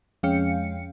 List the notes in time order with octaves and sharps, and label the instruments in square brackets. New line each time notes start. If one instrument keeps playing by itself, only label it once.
[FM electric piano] F2 G#3 C#4 F5 G5 C#7